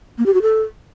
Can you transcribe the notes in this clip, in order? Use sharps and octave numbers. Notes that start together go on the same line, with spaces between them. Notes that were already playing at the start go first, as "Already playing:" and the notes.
A#3
G4
F#4
A4